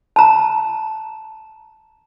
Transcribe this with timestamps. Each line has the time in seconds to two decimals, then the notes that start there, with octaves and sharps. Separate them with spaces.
0.16 A5 A#5